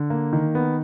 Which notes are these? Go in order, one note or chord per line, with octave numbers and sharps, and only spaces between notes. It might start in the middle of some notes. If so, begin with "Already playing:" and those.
Already playing: D3
A#3
D#3
B3